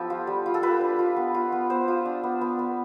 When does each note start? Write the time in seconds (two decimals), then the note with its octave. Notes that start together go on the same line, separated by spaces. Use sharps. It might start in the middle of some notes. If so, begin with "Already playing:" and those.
Already playing: F3 B3 G4 A4
0.10 F4
0.27 G3
0.46 F4
0.54 A4
0.63 F4 B4
0.81 D4
0.99 F4
1.16 B3
1.34 F4
1.52 B3
1.70 B3 C5
1.88 F4
2.05 D4
2.23 B3
2.41 B3
2.59 B3